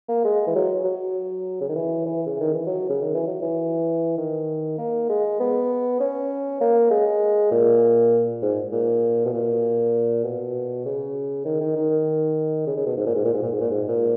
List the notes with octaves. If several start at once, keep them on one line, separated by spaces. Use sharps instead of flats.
A#3
G#3
E3
F#3
F#3
C#3
D#3
E3
E3
C#3
D#3
E3
F#3
C#3
D#3
E3
F#3
E3
D#3
A#3
G#3
B3
C#4
A#3
G#3
A#2
G#2
A#2
B2
A#2
B2
C#3
D#3
D#3
D#3
C#3
C#3
B2
G#2
A#2
G#2
A#2
G#2
A#2
G#2
A#2
G#2
A#2